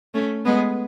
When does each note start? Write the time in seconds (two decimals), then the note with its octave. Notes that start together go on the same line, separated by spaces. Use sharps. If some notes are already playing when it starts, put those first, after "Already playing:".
0.14 A3 C#4
0.45 G#3 B3